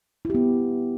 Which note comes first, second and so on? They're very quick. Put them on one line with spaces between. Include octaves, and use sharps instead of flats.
E4 G4 B3